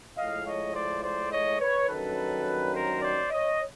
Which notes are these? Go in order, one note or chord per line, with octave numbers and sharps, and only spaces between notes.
A2 F3 G#3 D#5 F5
C#5 D#5
C5 D5
C5 D5
C#5 D#5
B4 C#5
G2 D#3 F#3 A#3 C#4 A4 B4
A#4 C5
C5 D5
C#5 D#5